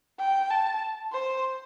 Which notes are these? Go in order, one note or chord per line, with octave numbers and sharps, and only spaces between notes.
G5
A5
C5